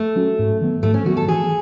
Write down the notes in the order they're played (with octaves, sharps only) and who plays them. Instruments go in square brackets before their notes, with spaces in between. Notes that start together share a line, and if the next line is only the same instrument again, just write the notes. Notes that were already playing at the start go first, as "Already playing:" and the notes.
Already playing: [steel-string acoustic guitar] A3
[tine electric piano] F#3 C#4 F#4
G#2
D#3 F#3 B3
[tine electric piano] G#2 [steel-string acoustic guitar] A3
[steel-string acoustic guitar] C#4
[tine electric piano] D#3 F#3 B3 [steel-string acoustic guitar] F#4
[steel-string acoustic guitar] A4
[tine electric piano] E3 [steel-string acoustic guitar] G#4